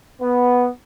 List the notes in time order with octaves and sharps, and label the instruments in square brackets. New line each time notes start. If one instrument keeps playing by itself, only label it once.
[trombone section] B3